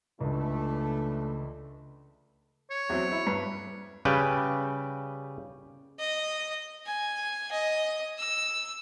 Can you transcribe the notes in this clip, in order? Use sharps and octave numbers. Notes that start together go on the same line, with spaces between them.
C#2 E3 A3 D4
C#5
E2 F#3 C4
E4
G2 B4
C#3 G3 B4 G5
D#5
G#5
D#5
E6